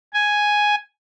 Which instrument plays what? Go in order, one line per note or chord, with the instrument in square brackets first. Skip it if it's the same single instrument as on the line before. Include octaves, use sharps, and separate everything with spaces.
[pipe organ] G#5